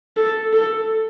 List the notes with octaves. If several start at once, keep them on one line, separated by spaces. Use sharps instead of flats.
A4
A4